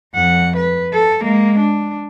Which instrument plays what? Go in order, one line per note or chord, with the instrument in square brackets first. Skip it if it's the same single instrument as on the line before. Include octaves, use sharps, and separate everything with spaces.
[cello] F2 F#5
B4
A4
G#3 A#3
D4